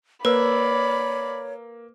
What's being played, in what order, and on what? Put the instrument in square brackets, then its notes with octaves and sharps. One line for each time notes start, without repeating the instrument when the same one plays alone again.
[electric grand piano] A#3 E6 [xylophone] B4 [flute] C#5 [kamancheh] D5 B5